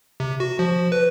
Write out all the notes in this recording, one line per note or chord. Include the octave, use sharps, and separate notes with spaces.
C3
F#4
F3
B4